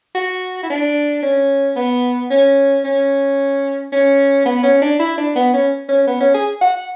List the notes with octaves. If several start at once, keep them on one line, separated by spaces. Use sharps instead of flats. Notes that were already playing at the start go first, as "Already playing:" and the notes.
F#4
E4
D4
C#4
B3
C#4
C#4
C#4
B3
C#4
D4
E4
D4
B3
C#4
C#4
B3
C#4
G#4
F#5